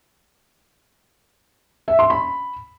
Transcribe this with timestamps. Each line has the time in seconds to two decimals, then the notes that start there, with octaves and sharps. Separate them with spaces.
1.88 E5
1.99 C6
2.10 B5